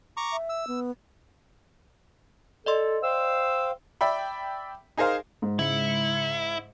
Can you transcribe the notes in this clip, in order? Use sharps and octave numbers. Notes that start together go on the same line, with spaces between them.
A#5 C#6 D6
E5
E6
B3
A4 D5 D#5 C6
C5 F5 G5 E6
D5 E5 G5 B5
D#4 G#4 A#4 C5 F5
G#2
C#3 G#3 E4 C#7